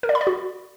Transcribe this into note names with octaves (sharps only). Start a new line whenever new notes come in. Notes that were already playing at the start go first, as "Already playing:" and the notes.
A#4
D5
B5
D5
F#4